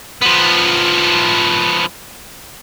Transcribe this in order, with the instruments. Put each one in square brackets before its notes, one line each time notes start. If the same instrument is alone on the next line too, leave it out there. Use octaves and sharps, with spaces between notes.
[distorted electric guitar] F3 B3